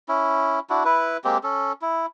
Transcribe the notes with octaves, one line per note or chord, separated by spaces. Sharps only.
C#4 E4
D4 E4 F#4
E4 B4
G#3 A#3 C4 G4
C#4 A4
E4